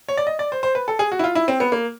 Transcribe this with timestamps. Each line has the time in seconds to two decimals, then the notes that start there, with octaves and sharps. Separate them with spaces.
0.09 C#5
0.17 D5
0.27 D#5
0.39 D5
0.52 C5
0.63 C5
0.75 B4
0.88 A4
0.99 G#4
1.12 F#4
1.19 E4
1.24 F4
1.35 E4
1.48 C4
1.60 B3
1.72 A#3